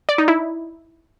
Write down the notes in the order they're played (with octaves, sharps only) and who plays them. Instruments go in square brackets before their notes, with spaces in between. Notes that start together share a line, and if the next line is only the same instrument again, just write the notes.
[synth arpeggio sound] D5
D#4
E4